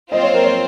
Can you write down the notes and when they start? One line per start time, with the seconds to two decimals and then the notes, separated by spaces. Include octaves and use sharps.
0.12 C4 F4 C5 D#5
0.23 C#5
0.34 A#4
0.44 C#5